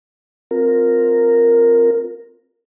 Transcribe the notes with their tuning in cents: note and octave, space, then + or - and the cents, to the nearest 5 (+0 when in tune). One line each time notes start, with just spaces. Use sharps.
C4 +0 F4 +20 A#4 -5